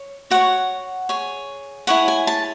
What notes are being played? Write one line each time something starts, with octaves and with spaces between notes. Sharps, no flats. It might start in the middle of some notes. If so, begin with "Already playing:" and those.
Already playing: C#5
F#4 C#5 F#5
G#4 C#5
E4 G#4 C#5 F#5
G#5
A5